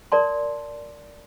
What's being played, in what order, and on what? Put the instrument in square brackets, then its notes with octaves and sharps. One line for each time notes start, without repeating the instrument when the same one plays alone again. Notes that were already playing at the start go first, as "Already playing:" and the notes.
[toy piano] A#4 D5 A5 C6